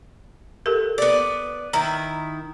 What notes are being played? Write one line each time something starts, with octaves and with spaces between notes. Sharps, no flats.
G4 A4 A#4
B3 D5
D#3 E4 A#5